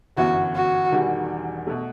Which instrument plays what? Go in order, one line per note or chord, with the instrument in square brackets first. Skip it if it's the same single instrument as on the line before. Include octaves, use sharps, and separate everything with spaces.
[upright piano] G1 F#2 E3 B3 [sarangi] F#4
[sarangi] F#4
[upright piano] E1 E2 D#3 G3
B2 A3